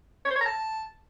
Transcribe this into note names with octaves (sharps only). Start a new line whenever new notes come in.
C#5
C5
C#5
A#5
A5